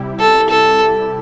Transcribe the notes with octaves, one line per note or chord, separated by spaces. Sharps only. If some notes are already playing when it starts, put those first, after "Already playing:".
Already playing: C3 G3 E4 G4
A4
A4